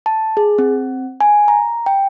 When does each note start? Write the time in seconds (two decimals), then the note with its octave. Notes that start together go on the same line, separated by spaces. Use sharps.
0.06 A5
0.37 G#4
0.58 C4
1.21 G#5
1.48 A#5
1.86 G5